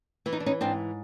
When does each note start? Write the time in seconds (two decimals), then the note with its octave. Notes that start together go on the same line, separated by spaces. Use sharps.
0.26 E3 E4
0.32 D#4
0.40 D4
0.46 C#4 D#4
0.61 G#2 C4 D4